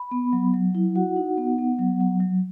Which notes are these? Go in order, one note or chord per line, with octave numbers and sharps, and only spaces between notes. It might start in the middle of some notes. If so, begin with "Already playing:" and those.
Already playing: B5
B3
F#3
F#3
E4
F#4 F#5
D#4
B3
B3
F#3
F#3
F#3